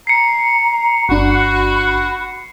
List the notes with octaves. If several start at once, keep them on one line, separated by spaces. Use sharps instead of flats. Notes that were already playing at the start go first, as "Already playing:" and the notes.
A#5 C7 C#7
G1 D4 F#4 B5